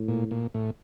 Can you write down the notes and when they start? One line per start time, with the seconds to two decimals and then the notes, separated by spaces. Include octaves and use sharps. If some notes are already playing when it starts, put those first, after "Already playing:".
Already playing: A2
0.08 A#2
0.31 A#2
0.54 A2